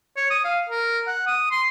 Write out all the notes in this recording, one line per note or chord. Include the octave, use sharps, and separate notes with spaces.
C#5
D#6
F5
A#4
F#5
D#6
C6